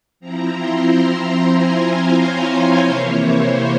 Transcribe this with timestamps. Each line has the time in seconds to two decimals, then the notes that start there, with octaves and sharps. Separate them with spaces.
0.20 F3 C4 E4 A#5
0.53 C6
0.86 A#5
1.20 A#5
1.53 G#5
1.85 F5
2.17 C#5
2.51 C5
2.83 C3 E3 A#3 E4 C#5
3.16 C5